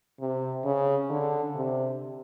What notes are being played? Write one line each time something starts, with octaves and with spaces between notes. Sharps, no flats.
C3
C#3
D3
C3